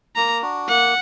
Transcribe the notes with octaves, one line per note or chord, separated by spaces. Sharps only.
A#3 A#5
D4 F#4
A#3 F#5